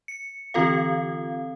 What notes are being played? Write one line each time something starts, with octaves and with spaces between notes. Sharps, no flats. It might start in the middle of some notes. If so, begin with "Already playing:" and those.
C#7
D3 E3 C4 F4 A4 F5